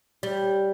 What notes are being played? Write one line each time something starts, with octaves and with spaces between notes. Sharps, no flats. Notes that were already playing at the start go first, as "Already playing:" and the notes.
G3